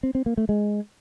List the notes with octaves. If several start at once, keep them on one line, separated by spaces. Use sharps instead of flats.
C4
C4
A#3
A3
G#3